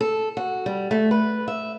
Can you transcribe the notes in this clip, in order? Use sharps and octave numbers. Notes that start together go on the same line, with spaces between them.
A4
F#4
G3
A3
B4
E5